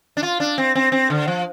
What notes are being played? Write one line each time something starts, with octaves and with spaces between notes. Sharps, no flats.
D4
F4
D4
C4
C4
C4
D3
F3